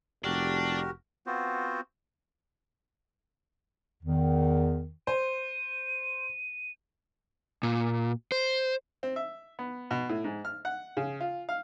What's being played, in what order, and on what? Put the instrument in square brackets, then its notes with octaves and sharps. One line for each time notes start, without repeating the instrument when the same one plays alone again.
[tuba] F1 [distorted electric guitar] D4 [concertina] F#4 G4 A#4
[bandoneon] B3 C4 F4 F#4 C5
[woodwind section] E2 D#3
[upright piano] C5 [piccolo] D#7
[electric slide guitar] A#2
C5
[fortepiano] C4
E5
B3
B2
A2
G#2
F6
F#5
C#3
F4
F5